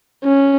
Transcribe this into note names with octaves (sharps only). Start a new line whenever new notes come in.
C#4